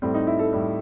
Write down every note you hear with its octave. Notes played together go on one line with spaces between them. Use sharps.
A2 G3 C4
D#4
E4
A4
A2 G3